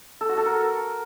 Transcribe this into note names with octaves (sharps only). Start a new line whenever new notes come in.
A4
F#4
A4
A#4